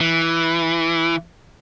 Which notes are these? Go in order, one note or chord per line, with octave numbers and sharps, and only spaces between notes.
E3